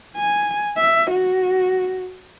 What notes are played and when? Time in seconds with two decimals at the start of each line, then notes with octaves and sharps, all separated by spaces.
0.16 G#5
0.77 E5
1.10 F#4